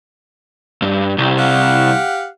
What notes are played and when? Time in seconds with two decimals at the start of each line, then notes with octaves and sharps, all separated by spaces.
0.82 G2
1.18 C2
1.38 G4 F5 F#5